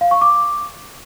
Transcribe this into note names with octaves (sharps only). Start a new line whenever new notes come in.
F5
C#6
D6